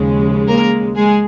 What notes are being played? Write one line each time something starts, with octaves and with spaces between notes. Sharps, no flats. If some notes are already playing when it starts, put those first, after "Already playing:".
Already playing: D#2 C#3 F3 G#3
A#3 A#4
G#3 G#4